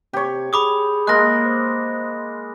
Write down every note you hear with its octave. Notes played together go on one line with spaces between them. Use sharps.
C3 G4 C#5
G#4 B5 D6 D#6
G#3 A#3 F#6 A#6
C5